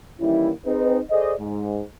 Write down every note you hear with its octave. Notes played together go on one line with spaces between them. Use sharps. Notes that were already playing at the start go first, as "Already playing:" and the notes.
D#3 E3 G3 A#3 C#4 E4
C4 D#4 G#4 B4
G#4 A4 C5 D5 D#5
G#2